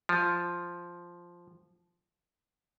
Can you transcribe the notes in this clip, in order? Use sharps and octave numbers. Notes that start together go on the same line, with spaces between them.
F3